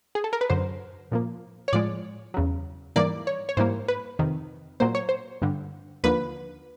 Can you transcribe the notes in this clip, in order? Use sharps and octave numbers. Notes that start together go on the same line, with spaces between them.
G#4
A4
A#4
B4
F#2 D3 F#3 C5
A#2 F3 A#3
C#5
A2 F3 G#3 D5
E2 C#3 F#3
G#2 E3 G3 A#3 D5
C#5
C#5
G#2 E3 G3 A#3 C5
B4
F2 C3 D#3
A#2 F#3 A#3 C5
C#5
C5
G2 D3 G3
D#2 D3 F3 A#3 B4